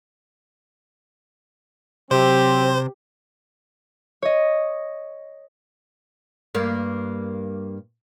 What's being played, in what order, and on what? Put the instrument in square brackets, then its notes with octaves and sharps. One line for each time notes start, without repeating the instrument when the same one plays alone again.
[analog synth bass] C3 [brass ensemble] F#3 C4 [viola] G4 [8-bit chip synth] C5
[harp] C#5 D#5
[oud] G2 A#3